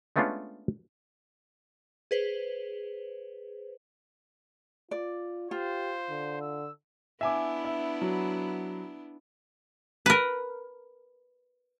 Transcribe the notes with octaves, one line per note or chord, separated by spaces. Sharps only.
G#3 A3 B3 C#4 D4 F4
G#4 B4 C5
F4 D5
F4 G4 C5
D3
E6
B3 D4 E4 E5 G#5 D6
E5
F#3
A#4 B4